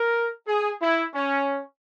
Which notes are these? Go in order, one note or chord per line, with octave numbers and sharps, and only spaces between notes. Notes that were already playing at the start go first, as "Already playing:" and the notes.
Already playing: A#4
G#4
E4
C#4